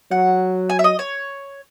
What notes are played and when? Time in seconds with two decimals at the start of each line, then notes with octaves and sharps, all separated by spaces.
0.11 F#3 F#5
0.70 G#5
0.79 E5
0.84 D#5
0.99 C#5